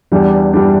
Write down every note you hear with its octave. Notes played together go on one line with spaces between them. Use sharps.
E2 E3 G3 D4
E3 G3 D4